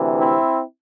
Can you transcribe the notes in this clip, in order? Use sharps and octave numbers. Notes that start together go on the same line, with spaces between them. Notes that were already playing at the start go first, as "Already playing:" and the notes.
Already playing: D2 C3 E3
C4 E4